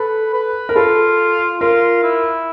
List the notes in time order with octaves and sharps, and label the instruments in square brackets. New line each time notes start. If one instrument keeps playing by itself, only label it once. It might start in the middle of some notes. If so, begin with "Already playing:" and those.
Already playing: [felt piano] A4 [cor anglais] B4
[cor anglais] B4
[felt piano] A#4
[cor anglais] F4 [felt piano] A4
[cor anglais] F4 [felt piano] A#4
[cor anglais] E4